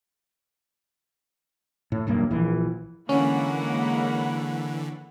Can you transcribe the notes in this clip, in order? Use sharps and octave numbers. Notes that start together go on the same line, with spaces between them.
A2
E1 B1 G2 A#3
A#1 E3
D3 E3 G#3 A#3 C#4 C#5 F#5 B5